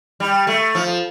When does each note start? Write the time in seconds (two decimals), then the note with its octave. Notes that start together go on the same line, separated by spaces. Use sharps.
0.20 G3
0.47 A3
0.75 F3